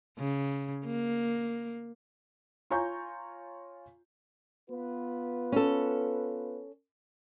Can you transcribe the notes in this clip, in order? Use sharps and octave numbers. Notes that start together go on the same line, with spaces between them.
C#3
A#3
F4 C#5 G#5 A#5 C#6 G6
B3 F4 B4
C#4 A4